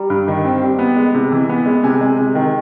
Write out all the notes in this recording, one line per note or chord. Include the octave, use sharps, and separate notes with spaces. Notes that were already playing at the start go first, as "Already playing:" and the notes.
Already playing: G3 A#5
G2
D#3
C4
G3
B3
G#3
C3
E3
B3
G#3
C3 G#5
G#3
C3
D#3